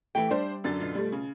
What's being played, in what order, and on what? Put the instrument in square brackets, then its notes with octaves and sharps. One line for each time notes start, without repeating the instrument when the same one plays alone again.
[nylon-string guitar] E3 G4 G5 [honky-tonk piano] A3
[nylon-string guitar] G3 [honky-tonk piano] D4 C5
[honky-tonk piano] F#2 D3 A6
[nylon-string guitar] B2 F4
[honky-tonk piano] G3 A3
C#3